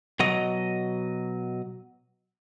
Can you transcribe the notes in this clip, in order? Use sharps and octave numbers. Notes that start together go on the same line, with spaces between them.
B2 F#3 D#5